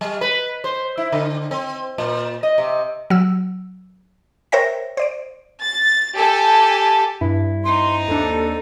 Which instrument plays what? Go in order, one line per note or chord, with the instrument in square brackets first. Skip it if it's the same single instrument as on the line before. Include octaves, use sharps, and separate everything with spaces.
[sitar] G3
B4
C5
E4
D3
C4
A#2
D#5
C3
[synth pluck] F#3 E6
A#4 C5 C#5 E5 G5 A#6
C5 D5 D7
[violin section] A6
G4 A4 G#5
[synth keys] G2 [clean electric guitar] E4
[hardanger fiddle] C4 D#4 [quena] C6
[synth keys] D#2 D4 [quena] A4